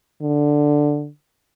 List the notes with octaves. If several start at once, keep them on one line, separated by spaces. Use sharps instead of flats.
D3